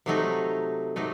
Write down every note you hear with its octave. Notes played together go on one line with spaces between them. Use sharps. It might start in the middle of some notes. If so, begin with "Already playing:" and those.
C3 F#3 A3 D#4
C3 F#3 A3 D#4